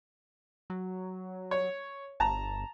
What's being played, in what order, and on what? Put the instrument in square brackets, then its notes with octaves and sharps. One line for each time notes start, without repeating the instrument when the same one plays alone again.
[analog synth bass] F#3
[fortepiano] C#5
[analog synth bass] G1 [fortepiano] A5 A#5